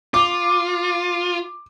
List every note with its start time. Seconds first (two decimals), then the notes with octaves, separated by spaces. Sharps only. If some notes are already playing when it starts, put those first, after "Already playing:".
0.14 F4 D6